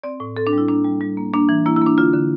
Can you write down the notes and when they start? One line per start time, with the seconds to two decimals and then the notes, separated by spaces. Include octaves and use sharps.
0.03 C4 D5
0.20 A2
0.37 C4 A4
0.47 D4
0.53 G3 E4
0.68 A#3 D4
0.84 G3
1.01 G3
1.17 A#3
1.33 A#3 D4
1.49 E3
1.66 A#3 E4
1.76 E4
1.81 A#3 D4
1.98 D3 F4
2.14 D3